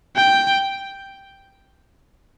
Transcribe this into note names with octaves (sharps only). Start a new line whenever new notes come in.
G5